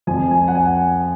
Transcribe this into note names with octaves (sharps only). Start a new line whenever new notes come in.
F2 F3 G#5
G#5
F#5
G#5